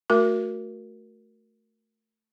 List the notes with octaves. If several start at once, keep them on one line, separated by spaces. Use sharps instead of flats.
A3 F#4 A#4